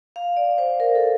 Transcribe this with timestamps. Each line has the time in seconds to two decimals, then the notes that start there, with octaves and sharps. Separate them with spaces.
0.16 F5
0.37 D5
0.58 C5
0.80 A#4
0.95 A4